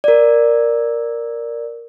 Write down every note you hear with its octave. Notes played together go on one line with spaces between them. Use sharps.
A#4 D5